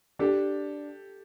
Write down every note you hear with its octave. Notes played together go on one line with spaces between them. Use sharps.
D4 G4 A4